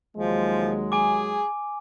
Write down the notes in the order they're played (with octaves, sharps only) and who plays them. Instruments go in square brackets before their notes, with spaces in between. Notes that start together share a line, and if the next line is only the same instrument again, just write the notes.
[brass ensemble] D#2 F#3 G#3 [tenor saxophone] F3
[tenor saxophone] G#4 [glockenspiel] G#5 D6